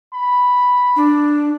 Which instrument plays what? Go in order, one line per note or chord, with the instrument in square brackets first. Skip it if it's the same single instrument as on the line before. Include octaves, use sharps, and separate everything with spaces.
[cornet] B5
[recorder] D4